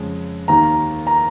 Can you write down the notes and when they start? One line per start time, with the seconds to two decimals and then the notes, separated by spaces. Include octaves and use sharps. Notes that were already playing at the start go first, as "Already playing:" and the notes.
Already playing: F2 C#3 G#3
0.48 D#2 D#3 A#3 A#5
1.07 A#5